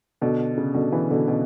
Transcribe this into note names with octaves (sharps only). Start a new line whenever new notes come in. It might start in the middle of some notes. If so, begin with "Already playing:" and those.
B2 D3
C#3
B2 D3
C#3 E3
B2 D3
B2